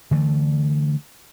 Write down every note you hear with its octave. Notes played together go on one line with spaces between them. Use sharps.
D3 E3 A3